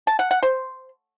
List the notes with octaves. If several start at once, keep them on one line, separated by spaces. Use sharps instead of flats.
A5
F#5
F#5
C5